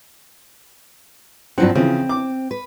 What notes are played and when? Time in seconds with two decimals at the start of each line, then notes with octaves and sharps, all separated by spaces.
1.58 G2 F3 F#3 C4 F#5
1.75 C#3 E3 F3 C4
2.09 D6
2.51 B4